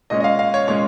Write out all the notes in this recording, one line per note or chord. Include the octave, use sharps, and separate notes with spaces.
A#2 G#3 C#4 D#5
D#5
F5
F5
C#5
A#2 G#3 C#4 C#5